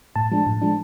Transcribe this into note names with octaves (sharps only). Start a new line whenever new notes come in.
A2 A5
F3 G#3 D4
A2
F3 G#3 D4